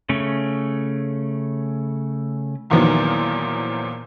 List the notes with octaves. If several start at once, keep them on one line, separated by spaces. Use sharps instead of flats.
C#3 A3 C#4
E2 A#2 D#3 F3 F#3 B3